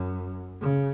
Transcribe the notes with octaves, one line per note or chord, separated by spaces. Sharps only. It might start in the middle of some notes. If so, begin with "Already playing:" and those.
Already playing: F#2
C#3